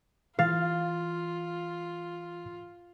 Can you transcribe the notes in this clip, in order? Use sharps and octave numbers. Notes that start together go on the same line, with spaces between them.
E3 F4 F5 A6